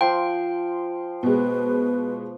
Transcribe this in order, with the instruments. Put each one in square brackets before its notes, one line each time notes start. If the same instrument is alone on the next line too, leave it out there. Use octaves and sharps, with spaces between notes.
[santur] F3 C6 [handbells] G5
[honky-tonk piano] B2 G#3 [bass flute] B4